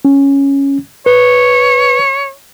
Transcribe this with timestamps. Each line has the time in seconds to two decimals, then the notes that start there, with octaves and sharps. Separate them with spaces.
0.05 C#4
1.06 B4 C#5